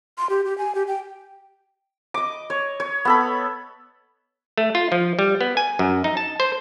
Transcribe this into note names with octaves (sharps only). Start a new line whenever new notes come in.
C6
G4
G4
G#5
G4
G5
D#5 D6
C#5
C#5
B3 A4 B5
A3
F4
F3
G3
B3
G#5
F#2
D#4
A5
C5